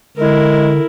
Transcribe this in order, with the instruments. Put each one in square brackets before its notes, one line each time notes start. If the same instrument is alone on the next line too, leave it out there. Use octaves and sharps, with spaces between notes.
[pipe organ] D3 [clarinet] G#3 [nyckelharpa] E4 A#4